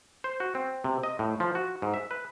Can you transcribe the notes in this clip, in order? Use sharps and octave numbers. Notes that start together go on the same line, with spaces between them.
C5
F#4
C4
C3
D#5
A2
F3
F#4
G#2
E5
B4